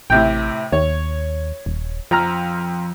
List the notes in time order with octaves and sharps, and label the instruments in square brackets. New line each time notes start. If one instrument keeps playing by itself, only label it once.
[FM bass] A1 [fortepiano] A2 C3 G5
[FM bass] D#2 [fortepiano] C#5
[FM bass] D#1
[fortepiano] F2 A#5 F6 [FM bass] F3